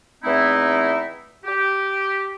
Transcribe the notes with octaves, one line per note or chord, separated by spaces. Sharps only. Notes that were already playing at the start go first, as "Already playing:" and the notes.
E2 A3 C4 D#4 E4
G4